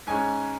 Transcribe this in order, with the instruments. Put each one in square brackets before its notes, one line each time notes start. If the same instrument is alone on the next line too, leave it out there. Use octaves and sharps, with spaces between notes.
[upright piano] G#2 G#3 C#4 G#5